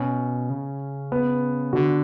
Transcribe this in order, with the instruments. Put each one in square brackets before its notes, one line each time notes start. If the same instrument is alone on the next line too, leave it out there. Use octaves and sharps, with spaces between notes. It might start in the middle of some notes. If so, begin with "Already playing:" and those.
Already playing: [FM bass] B2 [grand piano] C#4
[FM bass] C#3
[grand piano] B3
[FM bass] D3 [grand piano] F#4